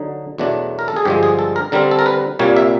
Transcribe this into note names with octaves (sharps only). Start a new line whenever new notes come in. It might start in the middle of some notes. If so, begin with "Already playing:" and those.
Already playing: D3 F#3 D#4
E2 B2 F#3 A3 D4
A#4
A4
G#4
G2 D3 F3 G#3 G4
G#4
A4
A#4
D3 G3 C4 A#4
A4
A#4
B4
C2 A#2 G3 A#3 C#5
E5